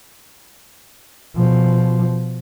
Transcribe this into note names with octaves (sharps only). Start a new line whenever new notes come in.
B2 F3